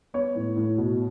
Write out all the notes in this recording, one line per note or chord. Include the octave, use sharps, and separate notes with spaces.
B3 C#5
A2
A2
B2